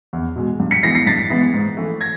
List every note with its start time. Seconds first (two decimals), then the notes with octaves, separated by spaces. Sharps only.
0.13 E2
0.36 B2 G#3
0.60 G2
0.71 B6 C#7
0.83 E3 G#3 B3 E4 A#6 C7
0.95 A#6 C7
1.06 G2 A6 B6
1.30 E3 G#3 B3 E4
1.54 G#2
1.77 E3 A3
2.01 G#6 A#6